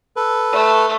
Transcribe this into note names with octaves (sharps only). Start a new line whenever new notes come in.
A4 B4
A3